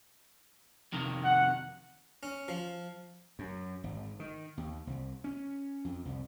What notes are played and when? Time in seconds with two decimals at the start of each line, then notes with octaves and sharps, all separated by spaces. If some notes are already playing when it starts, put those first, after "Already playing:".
0.92 F2 C3 D#3
1.24 F#5
2.23 C#4
2.48 F3
3.39 F#2
3.84 G#1
4.20 D#3
4.57 D#2
4.87 C2
5.24 C#4
5.85 F2
6.05 C2